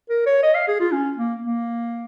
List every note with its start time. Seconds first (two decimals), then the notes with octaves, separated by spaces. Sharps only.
0.10 A#4
0.26 C#5
0.43 D#5
0.54 F5
0.68 G#4
0.80 F4
0.92 C#4
1.17 A#3
1.42 A#3